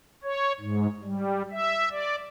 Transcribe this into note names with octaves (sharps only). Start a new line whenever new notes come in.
C#5
G#2
G3
E5
D5